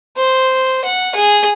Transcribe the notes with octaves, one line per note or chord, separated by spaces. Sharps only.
C5
F#5
G#4